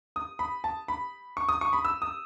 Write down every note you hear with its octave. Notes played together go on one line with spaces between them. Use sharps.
D#6
B5
A5
B5
C#6
D#6
C#6
B5
E6
D#6